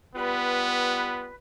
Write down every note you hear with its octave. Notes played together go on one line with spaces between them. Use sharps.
G3 B3 F4 B4